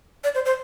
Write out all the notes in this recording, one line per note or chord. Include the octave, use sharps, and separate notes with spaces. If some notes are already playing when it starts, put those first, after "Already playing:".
D5
C5
C5